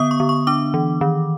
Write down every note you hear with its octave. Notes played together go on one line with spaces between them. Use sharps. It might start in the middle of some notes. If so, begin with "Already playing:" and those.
Already playing: D3 B3 D#6
C#6
D3
C#6
D4 D6
E3
D#3